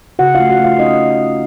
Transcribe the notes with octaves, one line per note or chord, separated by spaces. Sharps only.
C#3 F#4 F#5
A3 F4 F5
F#4 F#5
A3 F4 F5
C#4 D#4 D#5